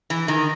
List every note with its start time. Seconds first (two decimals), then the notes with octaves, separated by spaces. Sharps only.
0.10 E3
0.28 D#3